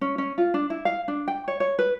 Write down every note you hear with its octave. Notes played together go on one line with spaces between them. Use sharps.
C#4
C#4
F4
D4
E4
F5
D4
G5
C#5
C#5
B4